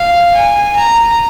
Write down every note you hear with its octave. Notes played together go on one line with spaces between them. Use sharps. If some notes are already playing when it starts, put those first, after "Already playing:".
Already playing: F5
G#5
A#5